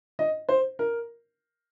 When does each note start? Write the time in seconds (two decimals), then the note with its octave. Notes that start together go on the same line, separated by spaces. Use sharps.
0.19 D#5
0.49 C5
0.79 A#4